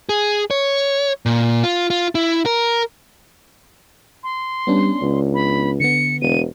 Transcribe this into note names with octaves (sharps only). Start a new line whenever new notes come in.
G#4
C#5
A#2
F4
F4
E4
A#4
C6
G3 B3 C#4 D4
C#2
B5
D3 B3 C#7
E1 D#7